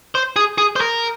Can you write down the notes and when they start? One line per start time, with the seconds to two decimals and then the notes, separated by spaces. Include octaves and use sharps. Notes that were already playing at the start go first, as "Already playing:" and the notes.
0.15 C5
0.36 G#4
0.58 G#4
0.76 C5
0.81 A#4